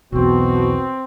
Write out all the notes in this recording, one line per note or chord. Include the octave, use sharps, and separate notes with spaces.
B1 E2 B2 C4 F#4